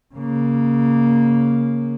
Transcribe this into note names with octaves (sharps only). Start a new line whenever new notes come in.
C#3 A#3